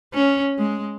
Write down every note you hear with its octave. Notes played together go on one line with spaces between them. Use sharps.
C#4
G#3